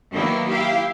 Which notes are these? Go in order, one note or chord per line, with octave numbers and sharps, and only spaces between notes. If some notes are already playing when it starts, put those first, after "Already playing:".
D#3 F#3 A#3 B3 E4 G4
E4 G4 F5